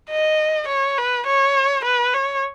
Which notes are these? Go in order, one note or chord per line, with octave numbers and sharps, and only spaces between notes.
D#5
C#5
B4
C#5
B4
C#5